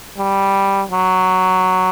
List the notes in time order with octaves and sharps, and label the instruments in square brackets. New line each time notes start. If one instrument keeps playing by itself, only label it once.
[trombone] G3
F#3